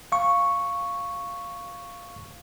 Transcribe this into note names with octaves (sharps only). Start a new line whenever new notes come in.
F5 C#6